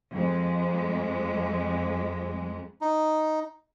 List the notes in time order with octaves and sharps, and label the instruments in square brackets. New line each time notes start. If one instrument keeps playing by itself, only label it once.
[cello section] F2 G#3
[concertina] D#4